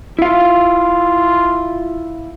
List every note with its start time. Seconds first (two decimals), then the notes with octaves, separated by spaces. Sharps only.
0.19 E4 F4 F5